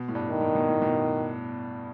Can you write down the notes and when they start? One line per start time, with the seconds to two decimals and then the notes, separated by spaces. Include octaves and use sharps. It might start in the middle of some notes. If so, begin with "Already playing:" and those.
Already playing: B2
0.08 A2
0.15 G2
0.28 D#3
0.41 A2
0.55 B2
0.68 A2
0.82 B2